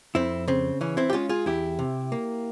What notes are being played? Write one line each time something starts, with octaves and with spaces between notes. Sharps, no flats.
F2 C4 E4
C#3 C4
E3 C#4
C4 E4
G4
G#3 C#4 F4
F4 G#4
E2 E4 G4
C3
A#3